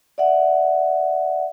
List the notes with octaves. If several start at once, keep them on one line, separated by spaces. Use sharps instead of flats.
D5 E5 F#5